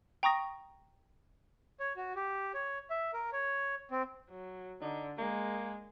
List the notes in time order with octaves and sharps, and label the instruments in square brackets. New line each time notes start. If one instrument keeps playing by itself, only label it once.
[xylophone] G5 A#5 C#6 D#6 A#6
[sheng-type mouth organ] C#5
F#4
G4
C#5
E5
A#4
C#5
C4
[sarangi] F#3
[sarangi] D3 [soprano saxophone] D#4
[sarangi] G#3 [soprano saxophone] A#3